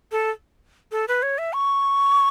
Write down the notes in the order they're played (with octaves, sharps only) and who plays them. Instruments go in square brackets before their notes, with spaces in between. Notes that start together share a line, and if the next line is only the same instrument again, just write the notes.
[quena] A4
A4
B4
C#5
E5
C#6